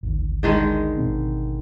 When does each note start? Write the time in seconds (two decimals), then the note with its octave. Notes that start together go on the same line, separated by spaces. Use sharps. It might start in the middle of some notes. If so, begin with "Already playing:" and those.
0.03 G#1 D2
0.43 D3 D#3 G#3
0.98 G#1 B2 C4